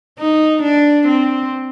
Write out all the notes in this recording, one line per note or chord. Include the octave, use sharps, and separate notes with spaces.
D#4
D4
C4